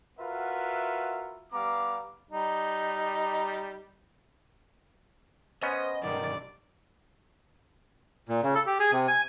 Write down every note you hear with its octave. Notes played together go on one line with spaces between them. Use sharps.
F4 F#4 A#4 B4 E5 F#5
G3 B3 F5 A#5 D6
G3 D#4
B3 C#4 C5 D#5
B1 G2 D#3 D5
A#2
C#3
A4
G4
G#4
C3
G#5